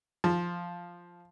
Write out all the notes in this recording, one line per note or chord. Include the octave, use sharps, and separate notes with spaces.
F3